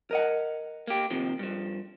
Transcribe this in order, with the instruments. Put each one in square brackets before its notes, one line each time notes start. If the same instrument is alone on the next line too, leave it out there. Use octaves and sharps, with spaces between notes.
[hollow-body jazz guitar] A#4 D#5 F#5
[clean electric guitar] A#3 G4
D#2 C3 F3
G2 F3